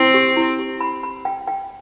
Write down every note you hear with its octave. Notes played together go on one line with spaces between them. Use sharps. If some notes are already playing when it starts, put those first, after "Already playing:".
Already playing: C4 E4
G4
E4
G4
B5
B5
G5
G5